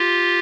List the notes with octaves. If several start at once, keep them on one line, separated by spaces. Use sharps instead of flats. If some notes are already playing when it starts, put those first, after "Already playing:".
Already playing: F4 G4